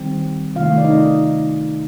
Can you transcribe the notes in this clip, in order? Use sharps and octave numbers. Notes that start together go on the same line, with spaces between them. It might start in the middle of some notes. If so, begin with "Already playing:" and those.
Already playing: D#3 G3 C4
C3 D#3 A3 F4 F5
D5
D#4 D#5